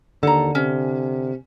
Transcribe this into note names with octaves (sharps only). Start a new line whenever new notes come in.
D#2 D3 A4 A#5
C3 C#4